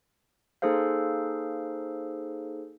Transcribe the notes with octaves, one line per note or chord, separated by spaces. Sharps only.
A#3 D#4 G#4 A4 C5 F5